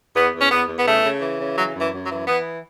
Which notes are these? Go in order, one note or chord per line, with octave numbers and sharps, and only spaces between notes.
E2 B3
E2
C#4
E2 B3
E2
B3
C#3 A3
C#3
E3
C#3
E3 F#3
F#2
E3
F#2
F#3
E3
E3 B3